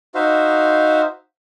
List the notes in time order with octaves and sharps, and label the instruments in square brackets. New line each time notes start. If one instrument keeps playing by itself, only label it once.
[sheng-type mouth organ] D#4 F#4 C5 E5 F5